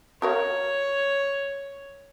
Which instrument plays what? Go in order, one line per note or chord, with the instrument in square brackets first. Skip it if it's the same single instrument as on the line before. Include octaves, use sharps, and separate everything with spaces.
[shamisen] F#4 A#4 F5 [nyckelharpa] C#5